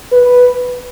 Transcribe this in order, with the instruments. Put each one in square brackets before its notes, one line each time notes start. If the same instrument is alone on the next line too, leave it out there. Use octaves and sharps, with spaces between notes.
[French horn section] B4